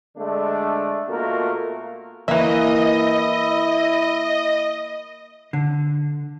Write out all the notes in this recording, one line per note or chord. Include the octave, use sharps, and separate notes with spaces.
D3 G#3 A3 D4
B2 A3 A#3 F4 F#4 A#4
E3 A#3 E4 D#5 E5
D3